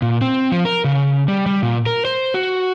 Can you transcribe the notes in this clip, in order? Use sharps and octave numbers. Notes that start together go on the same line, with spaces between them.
A#2
C4
F3
A#4
C#3
G3
G3
A#2
A#4
C5
F#4